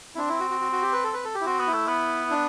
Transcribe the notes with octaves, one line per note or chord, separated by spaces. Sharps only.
E4
C4 D4
E4
F#4
F#4
F#4
F#4
G4
B4
A4
B4
A4
G4
E4
C4 F#4
B3
E4
A3
B3
D4